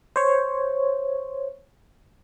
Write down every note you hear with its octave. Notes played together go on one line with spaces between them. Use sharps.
C5 C#5